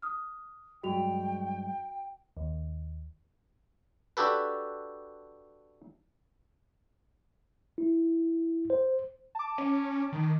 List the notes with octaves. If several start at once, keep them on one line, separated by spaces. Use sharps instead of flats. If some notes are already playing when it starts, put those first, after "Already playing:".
D#6 F6
G2 F#3 G#3 F#4 G5 F7
D#2
D4 F#4 G4 A4 B4
E4
C5
A5 D6
C#4
D#3